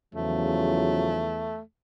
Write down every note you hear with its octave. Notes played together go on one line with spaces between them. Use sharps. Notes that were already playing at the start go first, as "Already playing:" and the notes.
E2 C#3 F3 F#3 A3